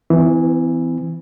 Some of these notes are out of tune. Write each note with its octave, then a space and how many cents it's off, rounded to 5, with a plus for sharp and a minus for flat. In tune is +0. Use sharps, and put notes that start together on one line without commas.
E3 +0 C4 -45